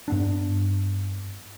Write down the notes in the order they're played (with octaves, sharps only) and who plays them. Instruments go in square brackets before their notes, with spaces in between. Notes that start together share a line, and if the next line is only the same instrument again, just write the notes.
[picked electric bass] G2 B3 D4